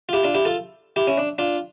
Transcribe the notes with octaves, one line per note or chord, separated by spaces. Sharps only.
F4
E4 G4
D4 F4
E4 G4
F4 A4
E4 G4
C#4 E4
D4
D4 F4